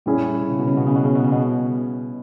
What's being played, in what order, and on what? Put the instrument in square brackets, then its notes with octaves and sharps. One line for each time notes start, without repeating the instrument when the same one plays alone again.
[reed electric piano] A#2 [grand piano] G3 C#4 E4 G#4
[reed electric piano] B2
C#3
B2
C#3
B2
C#3
B2
C#3
B2
C#3
B2